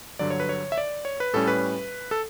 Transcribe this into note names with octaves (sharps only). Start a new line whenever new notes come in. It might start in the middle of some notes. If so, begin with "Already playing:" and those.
G2 D3 F#3 D5
C#5
B4
C#5
E5
D5
C#5
B4
A2 G3 C#4 A4
B4
A4